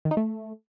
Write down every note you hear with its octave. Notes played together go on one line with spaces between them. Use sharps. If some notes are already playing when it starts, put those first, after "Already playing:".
D#3
D#4
A3